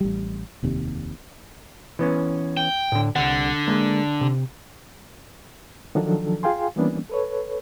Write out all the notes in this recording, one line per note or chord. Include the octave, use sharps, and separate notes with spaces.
A1 G3
F1 D#2 C3
E3 B3 C#4
G5
A2 D3
C2 D3 F#5
G#3 A#3
C3
D#3 F3 F#3 D4 A4
F4 G#4 F5 G5 G#5 C6
E3 G3 A#3 B3 C#4 D4
A4 B4 C#5